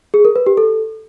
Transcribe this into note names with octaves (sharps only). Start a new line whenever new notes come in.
G#4
A#4
B4
G4
A4